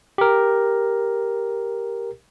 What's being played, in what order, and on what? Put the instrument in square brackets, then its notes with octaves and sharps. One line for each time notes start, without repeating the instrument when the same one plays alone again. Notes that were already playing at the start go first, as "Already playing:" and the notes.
[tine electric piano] G4 A#4